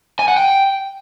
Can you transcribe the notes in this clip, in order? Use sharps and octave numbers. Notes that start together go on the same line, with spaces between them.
G#5
F#5
G5